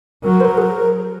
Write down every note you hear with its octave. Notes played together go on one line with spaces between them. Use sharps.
F#3 A#4
C5
A#4
G#4
A#4